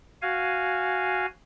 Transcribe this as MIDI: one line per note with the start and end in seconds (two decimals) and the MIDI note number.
0.22 1.26 66
0.22 1.26 77
0.22 1.26 80